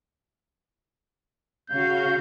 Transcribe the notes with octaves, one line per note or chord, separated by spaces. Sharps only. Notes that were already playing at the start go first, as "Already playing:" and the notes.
C#3 F#4 F5 G6